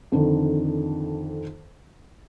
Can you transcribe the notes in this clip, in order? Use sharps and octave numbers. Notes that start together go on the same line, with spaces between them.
F2 D3 D#3